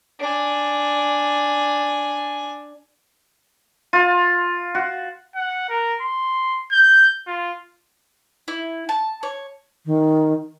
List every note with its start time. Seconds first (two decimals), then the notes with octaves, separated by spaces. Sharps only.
0.20 D4 G#5
3.93 F4
4.75 F#4
5.35 F#5
5.70 A#4
6.01 C6
6.72 G6
7.27 F4
8.48 E4
8.89 A5
9.23 C#5
9.86 D#3